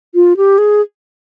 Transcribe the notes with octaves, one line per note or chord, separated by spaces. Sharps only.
F4
G4
G#4